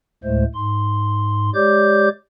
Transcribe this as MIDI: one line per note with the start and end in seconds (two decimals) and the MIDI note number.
0.24 0.44 38
0.24 0.44 45
0.24 0.44 56
0.24 0.44 57
0.24 0.44 72
0.54 1.50 44
0.54 1.50 84
1.54 2.09 56
1.54 2.09 67
1.54 2.09 73
1.54 2.09 74
1.54 2.09 86
1.54 2.09 91